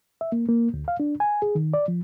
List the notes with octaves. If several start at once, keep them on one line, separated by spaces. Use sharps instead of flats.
E5
A#3
A#3
D2
F5
D4
G#5
G#4
D#3
D5
F3